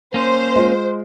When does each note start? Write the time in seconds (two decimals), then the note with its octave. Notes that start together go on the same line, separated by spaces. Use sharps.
0.14 A#3 C#4 C5
0.56 G#3 F4